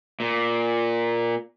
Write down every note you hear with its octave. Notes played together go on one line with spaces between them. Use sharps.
A#2